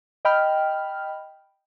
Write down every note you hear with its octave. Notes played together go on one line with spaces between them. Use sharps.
D#5 G5 B5 F6